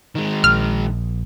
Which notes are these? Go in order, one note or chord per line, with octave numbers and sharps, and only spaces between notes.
D#3 G#3
A#1 F6